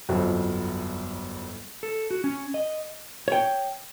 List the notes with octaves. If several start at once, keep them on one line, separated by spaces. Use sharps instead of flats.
G1 C2 F2 F#3
A4
F#4
C#4
D#5
C#5 G5